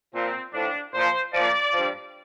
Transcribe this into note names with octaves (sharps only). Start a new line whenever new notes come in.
A#2 F3 C4
A2 F3 D4
A#2 F3 C5
A#2 F3 D5
G2 F3